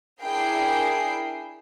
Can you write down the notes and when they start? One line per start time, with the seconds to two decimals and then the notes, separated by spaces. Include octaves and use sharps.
0.23 D4 E4 G#4 A#4 G5 C7